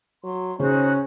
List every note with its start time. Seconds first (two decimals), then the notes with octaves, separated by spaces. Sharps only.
0.24 F#3 C6
0.60 C#3 C#4 D#4 F#4 C5